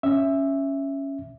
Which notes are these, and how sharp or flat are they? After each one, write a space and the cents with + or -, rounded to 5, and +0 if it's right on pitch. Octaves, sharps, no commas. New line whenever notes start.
C#4 +0 E5 +0